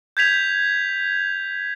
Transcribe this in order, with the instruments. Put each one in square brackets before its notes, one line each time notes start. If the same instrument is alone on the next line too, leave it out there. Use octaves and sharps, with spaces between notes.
[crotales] G6 G#6 B6 F7